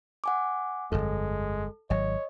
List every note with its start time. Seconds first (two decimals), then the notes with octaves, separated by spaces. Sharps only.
0.24 F#5 G#5 D6
0.92 G1 F2 G#3 A4
1.90 G#1 F#3 C#5 D#5